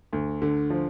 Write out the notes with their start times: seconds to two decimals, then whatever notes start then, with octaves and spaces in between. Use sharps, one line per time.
0.13 D2
0.42 D3
0.70 F3